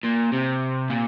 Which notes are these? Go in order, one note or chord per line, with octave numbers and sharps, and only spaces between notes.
A#2
C3
A#2